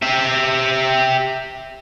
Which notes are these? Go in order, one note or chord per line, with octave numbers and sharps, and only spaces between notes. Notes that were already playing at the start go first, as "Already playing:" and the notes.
G4 E5